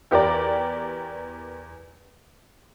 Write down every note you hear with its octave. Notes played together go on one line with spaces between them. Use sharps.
E2 G4 A#4 D5